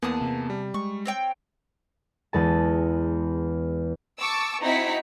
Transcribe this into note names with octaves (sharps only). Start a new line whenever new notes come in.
E2 A#3 B3 G#4 A5 D#6
C3
G3
G#3 C#6
C4 C#5 G5
E2 G#3 A5
A5 C#6 D6 E6
C4 D#4 E4 F#4 B6 C#7